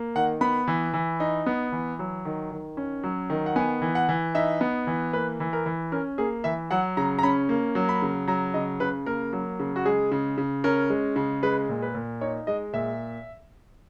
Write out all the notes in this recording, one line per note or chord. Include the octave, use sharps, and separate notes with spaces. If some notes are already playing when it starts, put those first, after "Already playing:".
Already playing: A#3
D#3 F#5
B3 B5
E3
E3
D#4
B3
E3
F#3
D#3
D#3
C#4
F#3
D#3
F#5
B3 G#5
E3
F#5
E3
D#4 E5
B3
E3
A#3 B4
E3
A#4
E3
C#4 A#4
A#3 G#4
E3 E5
F#3 F#5
C#3 A#5
A#5
C#4 B5
A#3
F#3
B5
C#3
F#3 A#5
C#3 D#5
C#3 B4
A#3 A#4
F#3
C#3
F#4
G#3 G#4
C#3
C#3
C#4 A#4
G#3
C#3
G#3 B4
A#2
B4
A#2
D#4 C#5
G#3 D#5
A#2 E5